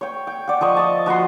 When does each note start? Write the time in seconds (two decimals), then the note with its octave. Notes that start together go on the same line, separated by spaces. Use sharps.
0.01 C#5 G5
0.27 G5
0.48 D5 F#5
0.61 F3 D#5 C#6 E6
0.77 D#5 A5
1.06 F3 F#4 F#5 C6